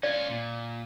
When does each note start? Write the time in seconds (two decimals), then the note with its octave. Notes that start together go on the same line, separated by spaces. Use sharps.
0.03 C#4 F4 D5
0.30 A#2